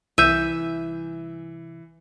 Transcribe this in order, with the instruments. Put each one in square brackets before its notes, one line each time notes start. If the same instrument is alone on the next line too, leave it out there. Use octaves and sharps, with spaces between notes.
[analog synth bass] C2 [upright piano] E3 [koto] E5 [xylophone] G6 D#7